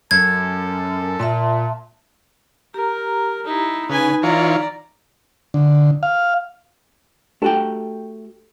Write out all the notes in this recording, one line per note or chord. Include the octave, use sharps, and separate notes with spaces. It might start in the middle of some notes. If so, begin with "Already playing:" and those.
F#2 A4 G#6
A#2 E5 A5 C6
G4 A#4 A#5
D#4 E4
C#3 D#4 B4 G#5
E3 F4 C#5 D5 A#5
D3
F5
A3 D4 F#4 G4 A4 G5